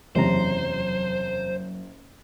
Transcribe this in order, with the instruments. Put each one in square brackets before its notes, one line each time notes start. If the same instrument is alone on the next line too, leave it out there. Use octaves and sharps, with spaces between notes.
[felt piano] F#1 [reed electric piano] E2 C3 A#5 [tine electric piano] F#3 [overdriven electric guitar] C5